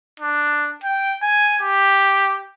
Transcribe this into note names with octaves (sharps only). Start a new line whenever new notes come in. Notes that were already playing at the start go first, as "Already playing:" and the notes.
D4
G5
G#5
G4